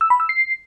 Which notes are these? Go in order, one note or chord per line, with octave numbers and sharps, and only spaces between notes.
E6
B5
E6
C7